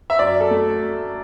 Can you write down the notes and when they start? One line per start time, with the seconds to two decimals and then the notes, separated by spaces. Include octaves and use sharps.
0.10 E5
0.19 F#2 D5
0.41 A4
0.51 A3